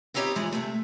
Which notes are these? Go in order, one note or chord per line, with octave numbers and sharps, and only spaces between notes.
B3 C4 D#4 G4 C#5 D#5
G#2 E3 F3 G#3
C3 A3